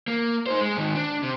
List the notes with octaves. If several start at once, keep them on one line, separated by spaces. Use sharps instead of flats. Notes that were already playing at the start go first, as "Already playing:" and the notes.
A#3
D#4 C5
G#3
G#2 D#3
D4
C3